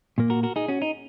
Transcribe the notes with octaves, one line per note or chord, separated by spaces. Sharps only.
A#2 A#3
F#4 A#4
F#4 A#4
D#4 G#4
C#4 F#4
D#4